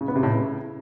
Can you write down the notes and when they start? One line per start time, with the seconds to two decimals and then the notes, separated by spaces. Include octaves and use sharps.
0.01 C#3
0.08 B3
0.16 C3
0.23 A2
0.30 C#3